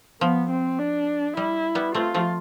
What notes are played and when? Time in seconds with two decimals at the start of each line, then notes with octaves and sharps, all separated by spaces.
0.21 F3 B3
0.50 C4
0.79 D4
1.37 G3 E4
1.75 G3 B3
1.94 A3 C4 F4
2.14 F3 A3